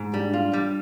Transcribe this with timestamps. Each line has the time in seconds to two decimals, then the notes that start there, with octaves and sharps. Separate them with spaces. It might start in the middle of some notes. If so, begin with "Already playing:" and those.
Already playing: G#2
0.14 G3 D4
0.33 F4
0.53 G3